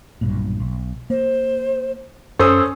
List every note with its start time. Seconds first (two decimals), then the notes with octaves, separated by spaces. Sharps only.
0.21 B1 G2 A#2
0.60 B1
1.10 A#3 C5
2.39 F#2 C#4 A4 C5 D#6 E6